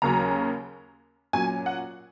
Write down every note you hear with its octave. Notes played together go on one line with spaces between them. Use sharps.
D#2 C#3 F#3 C#4 A#5
A#2 F#3 C#4 G#5
F#5